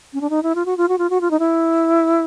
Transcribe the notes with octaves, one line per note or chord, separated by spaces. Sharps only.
C#4
D4
D#4
E4
F4
F#4
F4
F#4
F4
F#4
F4
D#4
E4